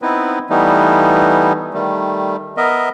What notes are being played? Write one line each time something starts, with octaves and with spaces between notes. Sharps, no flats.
B3 C4 D#4 E4 B4
E3 G3 A3 B3 D#4
D#3 G3 A3
B3 A#4 D#5 E5